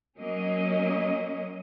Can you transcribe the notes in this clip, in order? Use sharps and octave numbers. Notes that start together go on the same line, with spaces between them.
F#3 A#3 C#4 D#5